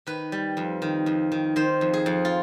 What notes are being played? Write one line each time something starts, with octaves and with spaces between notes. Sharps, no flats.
D#3 B4
G3
F2
D#3
F2
D#3
D#3 C5
F2
G#4
F2
F4